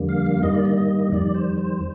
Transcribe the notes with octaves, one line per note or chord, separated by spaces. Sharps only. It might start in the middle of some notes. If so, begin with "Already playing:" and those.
Already playing: F2 D3 G3 A#3
F5
F5
G2 D#3 G3 A#3 D#5
D5
D#5
D#5
F2 D#3 G3 D5
C5
C5